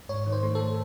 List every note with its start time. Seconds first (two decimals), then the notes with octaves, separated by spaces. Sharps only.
0.09 G#2 C#5
0.26 D#3
0.32 C5
0.43 A3
0.55 A4